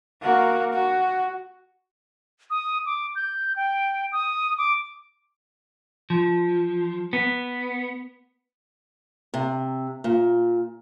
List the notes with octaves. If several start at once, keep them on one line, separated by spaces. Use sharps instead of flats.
A#3 F#4
F#4
D#6
D6
G6
G5
D#6
D6
F3
B3
C3
A#2